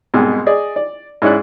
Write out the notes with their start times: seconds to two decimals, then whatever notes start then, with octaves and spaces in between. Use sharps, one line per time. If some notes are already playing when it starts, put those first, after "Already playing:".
0.14 C2 G#2 B2
0.46 G#4 D5 D#5
0.76 D5
1.22 G#2 C#4 E4 D5 F#6